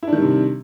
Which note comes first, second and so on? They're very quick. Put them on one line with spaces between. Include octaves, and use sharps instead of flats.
E4 D4 D#3 G3 C3